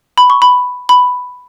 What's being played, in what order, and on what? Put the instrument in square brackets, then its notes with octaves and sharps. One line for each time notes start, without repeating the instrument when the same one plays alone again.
[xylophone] B5
C#6
B5
B5